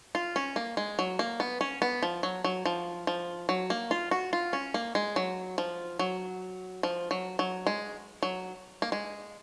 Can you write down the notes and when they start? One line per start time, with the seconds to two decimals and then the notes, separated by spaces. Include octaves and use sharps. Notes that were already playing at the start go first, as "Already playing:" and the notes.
0.15 F4
0.36 C#4
0.56 A#3
0.77 G#3
0.99 F#3
1.19 A#3
1.40 B3
1.61 C#4
1.82 B3
2.03 F3
2.23 F#3
2.44 F#3
2.66 F3
3.07 F3
3.49 F#3
3.70 A#3
3.91 F4
4.11 F#4
4.33 F4
4.53 C#4
4.74 A#3
4.95 G#3
5.16 F#3
5.58 F3
5.99 F#3
6.83 F3
7.11 F#3
7.39 F#3
7.67 G#3
8.23 F#3
8.82 A#3
8.92 G#3